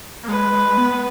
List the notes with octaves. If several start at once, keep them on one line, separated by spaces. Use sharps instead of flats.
A#3
G#3 B4
G#3
B3